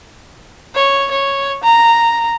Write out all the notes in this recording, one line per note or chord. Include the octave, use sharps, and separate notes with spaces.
C#5
C#5
A#5